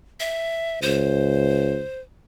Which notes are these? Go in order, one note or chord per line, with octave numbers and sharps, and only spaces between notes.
E5
C#2 C5